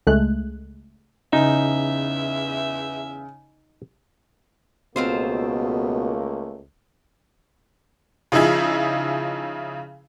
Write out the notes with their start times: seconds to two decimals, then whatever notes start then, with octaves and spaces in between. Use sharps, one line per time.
0.07 C#2 G#3 A3 F#6
1.33 E2 C#3 D#4 E5
4.96 C#2 B2 A3 A#3 C4 F4 C5
8.32 C#3 F3 D#4 E4 G#4